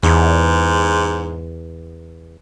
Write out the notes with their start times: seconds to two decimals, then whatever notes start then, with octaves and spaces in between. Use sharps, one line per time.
0.03 E2 G#2